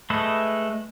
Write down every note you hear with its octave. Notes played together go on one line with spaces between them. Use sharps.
G#3 A3 A4 B4 D#5